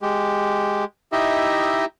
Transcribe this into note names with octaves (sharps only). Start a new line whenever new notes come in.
G#3 G4
D#4 E4 G4 D#5 E5